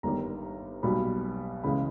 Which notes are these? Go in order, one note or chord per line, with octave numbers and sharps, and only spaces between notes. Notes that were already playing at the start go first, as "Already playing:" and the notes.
G1 G2 D#3 G3 A#5
B1 B2 G3 B5
C#2 C#3 E3 G#3 B5